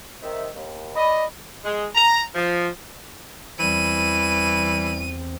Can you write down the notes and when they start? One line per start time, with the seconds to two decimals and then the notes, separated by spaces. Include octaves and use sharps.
0.23 C3 D#3 E5
0.56 D#2
0.96 D5 D#5 B5
1.64 G#3
1.95 A#5
2.35 F3
3.59 E2 E3 G3 C4 D#7